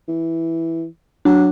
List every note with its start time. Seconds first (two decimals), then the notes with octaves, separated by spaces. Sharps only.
0.08 E3
1.25 F#3 D4